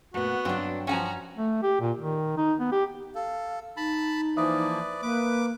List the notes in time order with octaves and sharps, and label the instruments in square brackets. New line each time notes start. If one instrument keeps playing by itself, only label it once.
[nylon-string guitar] A#2 A3 [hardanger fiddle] B3 [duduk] F#4
[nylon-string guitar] G2 F#3 G5 [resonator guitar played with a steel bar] C4 D4
[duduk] F3 [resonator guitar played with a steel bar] C#4 F#5 G#5 [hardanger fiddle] F#4 A#5
[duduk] A3
G4
A#2
D#3
D#4
B3
G4
[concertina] A4 [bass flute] F5
[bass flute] D#4 [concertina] A5 B5
[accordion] E3 F3 A#3 [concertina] B4 D5 [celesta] E5 D#6
[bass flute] A#3 [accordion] B4 [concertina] D6